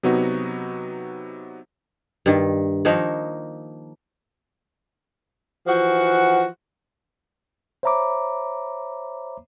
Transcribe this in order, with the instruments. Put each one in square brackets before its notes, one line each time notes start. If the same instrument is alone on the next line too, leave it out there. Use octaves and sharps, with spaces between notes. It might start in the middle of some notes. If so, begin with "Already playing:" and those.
[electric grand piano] C3 F#3 B3 D#4 F#4
[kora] G2 D#3
D#3 F3 A#3 D#4
[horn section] E3 F3 F#4 F#5
[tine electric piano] C5 C#5 E5 A#5 B5 D6